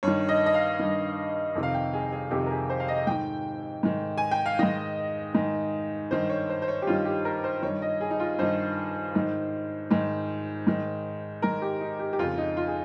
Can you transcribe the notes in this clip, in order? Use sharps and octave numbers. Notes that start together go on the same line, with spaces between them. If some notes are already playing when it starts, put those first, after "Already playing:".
G2 D#3 C#5
D#5
D#5
F5
G2 D#3
F2 C3 D#3
F5
G5
G#4
G#4
F2 C3 D#3 G4
A#4
G#4
C5
F5
D#5
G#2 D#3 G5
G#2 D#3
G#5
G5
F5
G#2 D#3 D#5
G#2 D#3
G2 D#3 C5
C#5
C5
C5
C#5
G4
G2 D#3 F4
G4
A#4
C5
G2 D#3 C#5
D#5
G#4
D#4
F4
G2 D#3 C5
G#2 D#3
G#2 D#3
G#2 D#3
G#2 D#3 A#4
G4
D#4
G4
G4
F2 C#3 F4
D#4
F4
G#4